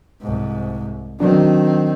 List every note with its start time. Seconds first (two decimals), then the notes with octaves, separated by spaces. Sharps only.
0.21 C2 G#2
1.20 D#3 F#3 C4 D4